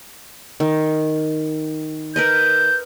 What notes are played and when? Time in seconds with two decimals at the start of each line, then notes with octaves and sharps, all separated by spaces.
0.60 D#3
2.16 A#4 B4 D#5 G6